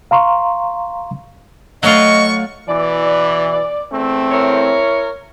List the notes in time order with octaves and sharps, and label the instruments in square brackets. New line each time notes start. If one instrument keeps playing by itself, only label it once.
[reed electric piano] F5 A#5 C6 C#6
[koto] F#3 F4 [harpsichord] A3 D5 [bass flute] D#5 [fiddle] C#6
[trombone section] B2 E3 [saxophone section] D5
[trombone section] E2 A3 C4
[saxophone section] E4 A#4 C#5